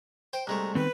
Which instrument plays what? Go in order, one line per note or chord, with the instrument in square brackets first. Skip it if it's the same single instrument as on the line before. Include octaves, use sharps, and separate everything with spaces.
[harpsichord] C5 [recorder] G5
[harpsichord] C2 G#3 A3 [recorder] A#5
[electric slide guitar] D#3 B3 C4 [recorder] B4